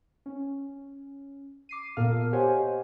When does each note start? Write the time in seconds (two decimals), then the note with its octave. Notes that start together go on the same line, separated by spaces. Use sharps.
0.26 C#4
1.69 D6 C7 D#7
1.97 A#2 B3 A4 A#4 F5 F6
2.33 G4 C5 C#5 D#5 F#5 G#5